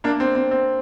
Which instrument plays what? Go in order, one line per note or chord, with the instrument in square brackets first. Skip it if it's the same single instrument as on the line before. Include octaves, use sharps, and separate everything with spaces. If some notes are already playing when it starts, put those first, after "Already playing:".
[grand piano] A#3 D4
C4
C4
C4